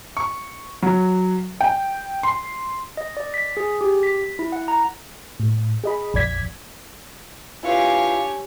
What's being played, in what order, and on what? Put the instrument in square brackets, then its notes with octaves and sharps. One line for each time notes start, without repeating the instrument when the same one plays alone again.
[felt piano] C#6
F#3
G5
C6
[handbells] D#5
D5
B6
G#4
G4
B6
E4
F#5
A#5
[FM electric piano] A2
G#4 D#5 B5
A#1 F2 D5 G#6 B6
[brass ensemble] D4 G#5 [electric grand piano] E4 F4 B4 [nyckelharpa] G4 C#5 [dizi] F5